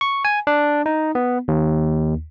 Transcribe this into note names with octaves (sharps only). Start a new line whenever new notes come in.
C#6
G#5
D4
D#4
B3
D#2